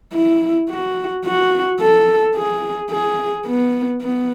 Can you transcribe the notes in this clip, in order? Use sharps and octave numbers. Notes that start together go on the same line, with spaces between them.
E4
F#4
F#4
A4
G#4
G#4
B3
B3